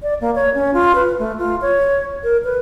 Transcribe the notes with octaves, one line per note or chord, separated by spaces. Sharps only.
D5
A#3
C#5
C#4
F4
B4
A3
F4
C#5
A#4
B4